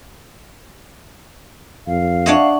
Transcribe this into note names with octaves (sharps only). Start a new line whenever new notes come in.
F2 F5
D4 C#5 D#5 E5 F#5 C#6